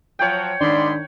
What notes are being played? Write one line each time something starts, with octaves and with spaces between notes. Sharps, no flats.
F3 F#3 C#5 F#5 G5
G#2 D#3 D4 D5 B5 C6